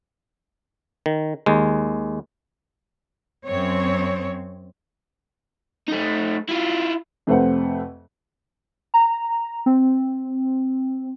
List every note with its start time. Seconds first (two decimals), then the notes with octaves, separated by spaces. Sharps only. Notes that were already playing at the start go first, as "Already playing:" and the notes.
1.06 D#3
1.46 D#2 G#3
3.46 F#2 C4 C#5
5.88 A3 D#4
6.48 E4 F4
7.27 F2 C3 A3 B4 C5 F#5
8.94 A#5
9.66 C4